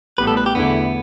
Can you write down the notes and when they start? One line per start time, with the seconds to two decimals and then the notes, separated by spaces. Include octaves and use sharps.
0.18 A1 A2 G3 B3 B4
0.27 A4
0.37 B4
0.46 G4
0.55 E2 D3 A3 B3 E4